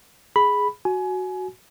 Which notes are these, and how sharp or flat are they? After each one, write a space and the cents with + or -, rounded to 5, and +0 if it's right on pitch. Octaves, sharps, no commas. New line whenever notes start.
G#4 +0 B5 +0
F#4 +0 G#5 +25